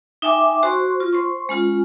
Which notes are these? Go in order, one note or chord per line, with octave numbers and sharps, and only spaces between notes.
D#4 E5 G5 G#5 D6
F#4 C5 C6 C#6
F4
C5 C6 C#6
G#3 C#4 F4